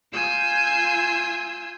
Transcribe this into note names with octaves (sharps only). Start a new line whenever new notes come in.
F4 G#5 E6 G6